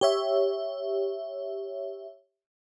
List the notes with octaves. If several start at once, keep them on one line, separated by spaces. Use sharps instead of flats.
G4 C#5 E5